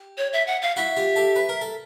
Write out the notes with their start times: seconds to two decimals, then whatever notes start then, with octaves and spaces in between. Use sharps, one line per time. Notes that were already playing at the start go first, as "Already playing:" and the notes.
Already playing: G4
0.18 C#5
0.33 E5
0.47 F#5
0.62 F5
0.76 E4 F#4 E5
0.97 F4 G4
1.16 G4 A4
1.36 B4
1.49 A#4
1.61 A4